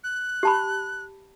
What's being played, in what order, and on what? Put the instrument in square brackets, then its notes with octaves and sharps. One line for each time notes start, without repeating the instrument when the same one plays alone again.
[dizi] F#6
[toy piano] G4 A5 B5